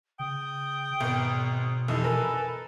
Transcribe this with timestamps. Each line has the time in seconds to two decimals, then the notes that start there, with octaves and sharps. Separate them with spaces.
0.19 C#3 G5 D#6
1.00 G#1 B2 B3
1.88 F1 E3 D#4 A4
2.04 A#4 B4 G#5